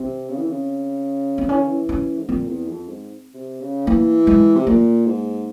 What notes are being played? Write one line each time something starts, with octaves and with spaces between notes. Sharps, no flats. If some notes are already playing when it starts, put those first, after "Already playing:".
Already playing: C3 C4
C#3
E3
C#3
C4
E3 C#4
C#3
E3
C#4
G#2
A#2 C4
E2
F2
G#2
C3
C#3
E3 A#3
G#3
C3
A#2 A#3
G#2